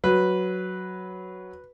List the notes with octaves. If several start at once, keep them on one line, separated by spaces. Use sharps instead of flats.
F#3 B4